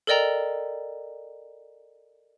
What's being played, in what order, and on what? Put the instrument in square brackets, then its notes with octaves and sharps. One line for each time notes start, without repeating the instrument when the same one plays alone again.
[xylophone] A4 A#4 D5 D#5 G5 A#5